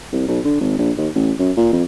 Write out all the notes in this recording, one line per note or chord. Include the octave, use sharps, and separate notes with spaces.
C2
B1
D3
G#1
A#1
D#2
A1
F#2
A#2
F2